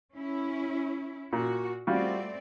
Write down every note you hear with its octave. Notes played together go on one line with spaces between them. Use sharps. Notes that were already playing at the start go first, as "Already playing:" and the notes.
C#4 E4
A#2 F#4
G3 A3 C4 F4 F#4 D5